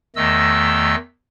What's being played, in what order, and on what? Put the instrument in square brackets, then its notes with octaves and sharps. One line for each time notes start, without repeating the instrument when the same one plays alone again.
[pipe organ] E2 D#3 A3 D#5 E6